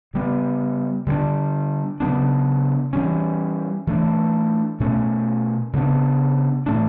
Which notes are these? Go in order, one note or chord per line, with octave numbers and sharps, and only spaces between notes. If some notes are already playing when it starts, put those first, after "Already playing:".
C#3 G3 B3
D3 G3 B3
D4
C#3 F#3 B3 D4
E3 G3 C#4
E3 A3 D4
B2 A3 C#4
C#3 G3 B3 D4
A2 E3 A3 D4